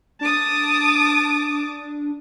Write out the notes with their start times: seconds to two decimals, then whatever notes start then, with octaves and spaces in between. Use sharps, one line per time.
0.21 D4 A5 D6 D#6